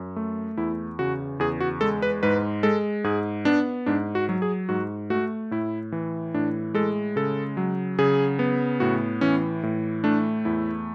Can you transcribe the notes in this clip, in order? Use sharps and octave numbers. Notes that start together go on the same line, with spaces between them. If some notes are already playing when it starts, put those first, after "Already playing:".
Already playing: F#2
A3
E2 E4
C#3 F#4
E2 G#4
F#4
G#3 A4
B4
G#2 B4
G#3 A4
G#2 G#4
B3 D4
G#2 D4
F#4
F#3
G#4
G#2 F#4
A3 F#4
A2 E4
E3
A2 D4
G#3 A4
C#3 A4
F#3
C#3 G#4
B3
A2 F#4
E3 C#4
A2
A3 D4
E2 E4